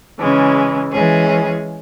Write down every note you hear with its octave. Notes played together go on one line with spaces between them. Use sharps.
C#3 E3 G#3 C#4
E3 G#3 C#4 G#4